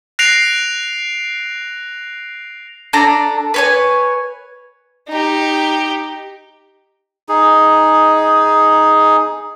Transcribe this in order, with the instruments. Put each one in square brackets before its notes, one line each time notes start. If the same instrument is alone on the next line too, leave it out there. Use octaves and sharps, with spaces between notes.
[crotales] F#6 A#6 C7 D7 F7
[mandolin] D4 A4 A#5
B4 C#5 G#5
[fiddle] D#4 G4
[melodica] D#4 G#4